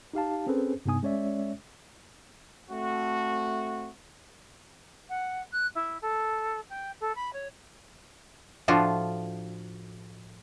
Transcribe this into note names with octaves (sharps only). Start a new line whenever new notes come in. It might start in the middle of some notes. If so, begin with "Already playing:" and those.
D#4 G4 F5 A5
C4 C#4 G#4 A4 B4 C5
G2 C3 B3 D#4 G#5 D#6
G#3 C#4 C#5 D5 E5
A3 C4 F#4
F#5
F#6
E4
A4
G5
A4
B5
C#5
A2 F3 D4 F4 F#4